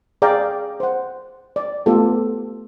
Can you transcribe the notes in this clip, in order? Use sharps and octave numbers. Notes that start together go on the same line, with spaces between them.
G#4 D5 F5 G5 A#5
C5 F#5
D5
A3 B3 F4 G4 A4